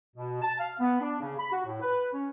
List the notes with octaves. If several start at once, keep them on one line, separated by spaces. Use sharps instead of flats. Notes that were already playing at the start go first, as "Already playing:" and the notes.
B2
A5
F5
B3
D4
C#3
B5
F#4
A2
B4
C#4